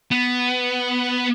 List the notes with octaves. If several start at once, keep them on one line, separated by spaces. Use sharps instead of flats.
B3